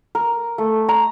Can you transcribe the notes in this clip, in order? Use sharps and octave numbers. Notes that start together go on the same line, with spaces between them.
A#4
A3
A#5